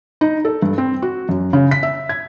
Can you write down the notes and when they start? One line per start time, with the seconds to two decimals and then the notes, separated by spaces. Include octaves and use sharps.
0.21 D#4
0.45 A4
0.62 G2
0.78 C4
1.02 F#4
1.29 F#2
1.53 C#3
1.71 B6
1.83 E5
2.09 G#6